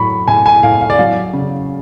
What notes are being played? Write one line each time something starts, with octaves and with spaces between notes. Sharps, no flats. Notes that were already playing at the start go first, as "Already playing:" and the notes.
Already playing: A2 F#3 B5 C#6
A2 G#5
G#5
A2 F5
F5
D5
F#3 F5
C#3